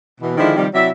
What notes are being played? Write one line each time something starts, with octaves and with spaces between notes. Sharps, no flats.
B2 E3
D3 D#3 F3 G#3 D4 E4
C3 D#3 F3 G3
C3 F#3 E4 D5 E5